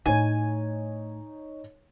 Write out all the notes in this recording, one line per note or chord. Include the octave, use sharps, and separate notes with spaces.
A2 A3 D#4 C#5 G#5